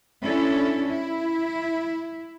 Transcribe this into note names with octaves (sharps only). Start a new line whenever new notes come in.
C#4 D4 E4 A4
E4